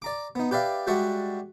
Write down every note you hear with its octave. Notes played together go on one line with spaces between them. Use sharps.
D5 A#5 D6
B3 D#4
G4 B4 D5 E5 F5
G3 G#3 F#4 D5 E5 F#5